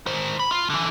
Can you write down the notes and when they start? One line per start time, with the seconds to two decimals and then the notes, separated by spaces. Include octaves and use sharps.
0.06 D#3 C5
0.40 B5
0.51 F4
0.70 D3 E3